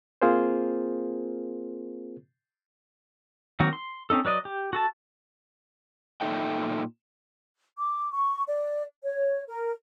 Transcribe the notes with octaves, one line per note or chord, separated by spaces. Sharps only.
A#3 C4 F4 G#4 A#4 C5
D#3 F#3 A#3 C4 F#4
C6
C4 C#4 D#4 A4
F#3 B4 D5 D#5
G4
F#4 A4 A5
A#2 D#4 A4 E5 G5
D6
C#6
D5
C#5
A#4